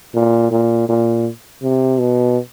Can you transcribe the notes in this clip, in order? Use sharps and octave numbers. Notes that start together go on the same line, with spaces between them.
A#2
A#2
A#2
C3
B2